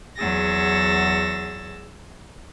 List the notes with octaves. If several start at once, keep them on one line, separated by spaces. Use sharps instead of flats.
E2 F#3 G#4 E6 A6 A#6